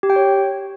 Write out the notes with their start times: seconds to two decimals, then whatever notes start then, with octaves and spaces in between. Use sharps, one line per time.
0.03 G4
0.10 G5
0.16 C#5